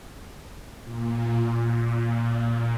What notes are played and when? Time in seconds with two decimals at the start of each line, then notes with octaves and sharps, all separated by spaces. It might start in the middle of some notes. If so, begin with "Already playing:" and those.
0.83 A#2
1.44 A#2